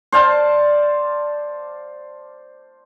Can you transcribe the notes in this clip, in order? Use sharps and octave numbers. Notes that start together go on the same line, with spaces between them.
C5 D5 F5 A5